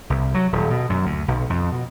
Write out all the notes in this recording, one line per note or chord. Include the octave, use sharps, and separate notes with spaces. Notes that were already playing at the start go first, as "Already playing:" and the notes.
C2
F#3
D#1
B2
F#2
D2
B1
F2
B2